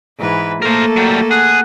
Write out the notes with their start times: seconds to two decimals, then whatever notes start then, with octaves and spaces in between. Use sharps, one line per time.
0.18 G#2 E3 B4
0.62 A3 A#3 A4 A#4 C5
0.97 F#3 G3
1.31 G#4 F#5